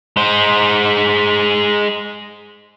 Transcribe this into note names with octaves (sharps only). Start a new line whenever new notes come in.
G#3 C5